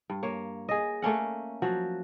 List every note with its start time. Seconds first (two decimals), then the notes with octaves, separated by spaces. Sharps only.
0.10 G2
0.23 A#3 C#5
0.69 G#4 D#5
1.02 A3 A#3 C#4 F#5
1.62 F3 F#3 F#4